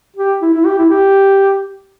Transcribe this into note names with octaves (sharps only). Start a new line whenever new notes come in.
G4
E4
E4
G4
E4
G4